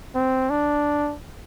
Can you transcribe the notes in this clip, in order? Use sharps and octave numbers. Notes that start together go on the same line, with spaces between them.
C4
D4